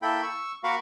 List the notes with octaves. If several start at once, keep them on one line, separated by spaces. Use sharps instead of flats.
A#3 E4 A4 G5 B5
C#6 E6
A#3 F#4 A#4 F5 B5 C#6